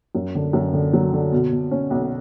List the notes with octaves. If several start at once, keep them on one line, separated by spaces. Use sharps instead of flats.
F#2
D3
F#2
D3
F#3
D3
B2
B2
C#4
B1